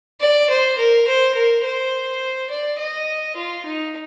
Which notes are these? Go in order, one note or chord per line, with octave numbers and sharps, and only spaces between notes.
D5
C5
A#4
C5
A#4
C5
D5
D#5
F4
D#4